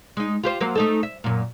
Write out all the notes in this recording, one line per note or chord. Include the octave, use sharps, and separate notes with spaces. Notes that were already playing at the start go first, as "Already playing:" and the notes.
G#3 D#4
F4 G4 C5
F#3 A#3 C5
A3 D#4 A4
E5
F#2 A#2